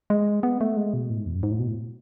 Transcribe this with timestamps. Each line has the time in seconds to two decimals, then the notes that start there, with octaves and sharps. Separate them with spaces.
0.10 G#3
0.43 B3
0.61 A3
0.77 G#3
0.94 B2
1.10 A2
1.18 G#2
1.26 E2
1.34 F#2
1.43 G#2
1.51 A2
1.59 B2
1.68 A2